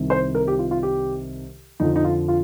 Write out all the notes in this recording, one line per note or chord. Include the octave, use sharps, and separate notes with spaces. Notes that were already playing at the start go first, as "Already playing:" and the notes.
Already playing: C2 C3 D#3
C5
A#4
G4
F4
F4
G4
F2 D3 F3 D#4
D#4
F4
F4